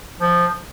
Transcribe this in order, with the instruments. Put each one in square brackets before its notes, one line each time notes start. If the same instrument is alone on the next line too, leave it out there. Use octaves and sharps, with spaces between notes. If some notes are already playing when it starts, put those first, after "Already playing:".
[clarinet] F3